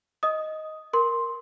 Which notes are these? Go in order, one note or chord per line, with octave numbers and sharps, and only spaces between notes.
D#5 D#6
A#4 C6